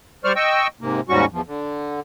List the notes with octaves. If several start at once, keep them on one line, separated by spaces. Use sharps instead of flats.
G3 C5 D5 C#6 F6
D#5 G5 C#6 E6
G#2 C3 A#3
D#2 G#2 G3 C#4 F#4 C#6
E2 F3
D3